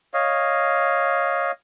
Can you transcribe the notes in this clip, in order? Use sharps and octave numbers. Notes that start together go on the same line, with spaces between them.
C#5 D#5 F5